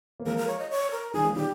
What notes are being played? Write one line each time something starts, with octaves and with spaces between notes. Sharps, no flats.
A#3
F3 G#3 A#4
A#4
C#5
D#5
C#5
A#4
D#3 G3 G#4
F3 G#3
D#3 G3 G4